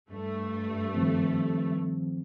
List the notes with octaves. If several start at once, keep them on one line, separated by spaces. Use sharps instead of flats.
G2 A3
D#3 F3 C4